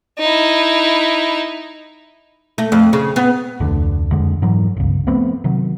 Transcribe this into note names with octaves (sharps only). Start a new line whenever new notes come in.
D#4 E4
A3
F2
C#3
B3
F1 D2 D3
F#1 F2 D3 G#3
G#2 E3 F#3
G1 C#2
F3 A3 B3 C4
C3 D#3 F#3